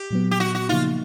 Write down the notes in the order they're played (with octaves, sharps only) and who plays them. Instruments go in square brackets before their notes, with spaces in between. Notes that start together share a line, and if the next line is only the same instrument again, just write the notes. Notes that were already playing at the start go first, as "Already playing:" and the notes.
Already playing: [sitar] G4
[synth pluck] A#2 F#3 B3
[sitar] G4
F#4
F#4
[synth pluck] C#3 F3 A#3 D#4 [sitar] F4